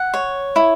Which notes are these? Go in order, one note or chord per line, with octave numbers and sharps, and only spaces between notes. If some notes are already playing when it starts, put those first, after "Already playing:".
Already playing: F#5
C#5
E4